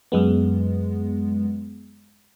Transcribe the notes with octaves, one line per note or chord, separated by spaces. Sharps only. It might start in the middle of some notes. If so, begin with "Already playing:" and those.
F#2 G#3 B3